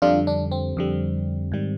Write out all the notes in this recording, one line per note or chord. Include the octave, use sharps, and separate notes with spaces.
F2 D3 G3 D4 F4
D4
C4
F2 D3 G3
G#2 D#3 G3